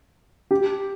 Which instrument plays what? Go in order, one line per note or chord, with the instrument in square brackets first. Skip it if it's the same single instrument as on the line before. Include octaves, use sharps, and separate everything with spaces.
[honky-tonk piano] G4